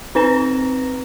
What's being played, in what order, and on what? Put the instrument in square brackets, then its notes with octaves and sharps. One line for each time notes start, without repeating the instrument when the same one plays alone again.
[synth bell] C4 D#4 B4 A#5 A#6 E7